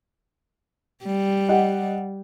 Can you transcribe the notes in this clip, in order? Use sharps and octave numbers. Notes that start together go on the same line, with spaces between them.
G3
G4 D#5 F#5